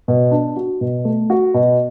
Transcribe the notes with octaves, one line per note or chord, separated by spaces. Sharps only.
B2
D4
F#4
B2
A3
F#4
B2